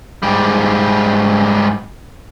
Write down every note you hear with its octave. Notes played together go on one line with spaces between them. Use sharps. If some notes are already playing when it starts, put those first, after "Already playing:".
G#2 G3